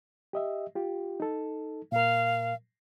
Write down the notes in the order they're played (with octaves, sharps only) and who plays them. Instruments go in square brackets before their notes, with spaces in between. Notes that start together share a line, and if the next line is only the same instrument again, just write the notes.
[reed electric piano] G4 D#5 E5
F4 G4
D#4 A4
[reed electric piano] A#2 A#4 [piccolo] F5